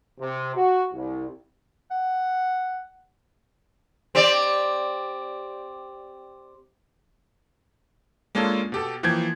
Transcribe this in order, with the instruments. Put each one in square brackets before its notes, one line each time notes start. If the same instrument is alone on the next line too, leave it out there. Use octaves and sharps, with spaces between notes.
[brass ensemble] C3
F#4
C2
[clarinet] F#5
[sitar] C4 G4 D5
[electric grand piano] G#3 A#3 C#4 D4 F4 A4
B2 G4 A4
E3 F3 A#3 G5 G6 G#6